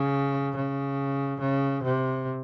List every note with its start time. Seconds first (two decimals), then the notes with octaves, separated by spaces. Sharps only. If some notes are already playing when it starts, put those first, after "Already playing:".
Already playing: C#3
0.56 C#3
1.40 C#3
1.83 C3